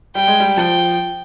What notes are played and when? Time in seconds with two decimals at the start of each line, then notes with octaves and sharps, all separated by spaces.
0.15 G3 G5
0.28 G#3
0.40 G3
0.57 F3 G5